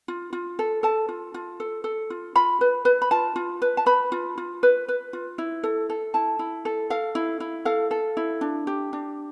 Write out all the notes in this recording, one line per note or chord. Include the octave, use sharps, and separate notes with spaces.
F4
F4
A4
A4 A5
F4
F4
A4
A4
F4
F4 B5
B4
B4
B5
F4 A5
F4
B4
A5
B4 B5
F4
F4
B4
B4
F4
E4
A4
A4
E4 A5
E4
A4
A4 F5
E4
E4
A4 F5
A4
E4
D4
G4
D4